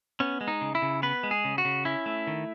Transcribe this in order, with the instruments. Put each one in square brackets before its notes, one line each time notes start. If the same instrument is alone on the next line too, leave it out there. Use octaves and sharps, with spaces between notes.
[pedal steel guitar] B3 C#4
G#3
D#4
C#3
E4
C#3
B3 B4
G#3
G#4
C#3
F#4
C#3
C#4 E4
A3
D#3